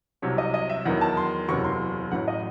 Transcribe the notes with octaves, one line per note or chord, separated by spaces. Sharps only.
C2 C3 F#3 C#5
D#5
D#5
E5
E2 D#3 F#3 F#5
A5
C6
F#1 E2 C3 F#3 C#6
C6
A1 A2 F#3 F#5
D#5